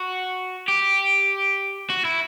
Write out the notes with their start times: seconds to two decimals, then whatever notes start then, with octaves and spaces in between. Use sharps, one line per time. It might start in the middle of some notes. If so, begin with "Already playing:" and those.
Already playing: F#4
0.68 G4
1.90 F#4
2.05 E4